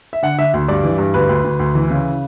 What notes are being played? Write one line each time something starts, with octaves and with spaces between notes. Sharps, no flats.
E5
D3 F#5
D3 E5
D2
G2 D5
E3
G2
D2 B4
D2
D2
D2
E3
C#3